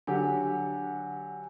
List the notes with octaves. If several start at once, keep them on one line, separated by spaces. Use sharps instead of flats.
D3 F#3 G4 G#5